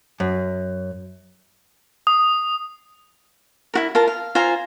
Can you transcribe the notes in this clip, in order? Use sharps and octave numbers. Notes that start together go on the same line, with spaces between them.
F#2
D#6
E4 F#4 A#4
F4 A#4 A5
F5
F4 C5 G#5 A#5